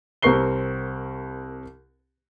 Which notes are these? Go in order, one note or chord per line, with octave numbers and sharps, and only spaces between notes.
C2 C4 A#4 C#6 C7 G7